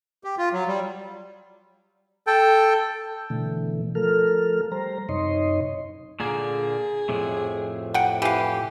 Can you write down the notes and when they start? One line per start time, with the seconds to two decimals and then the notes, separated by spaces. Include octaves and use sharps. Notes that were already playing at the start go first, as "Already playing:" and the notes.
0.24 G4
0.38 F4
0.53 F#3
0.68 G3
2.27 A4 G5
3.30 B2 D3 E3 A3
3.95 F3 A3 A4 A#4 F6
4.72 G3 C5 A#5
5.09 F#2 C3 D#4 C#5 D#5 C6
6.20 A#2 D3 A#3 G#4
7.09 F2 A2 C3
7.94 F#5 G5
8.22 E3 G4 F5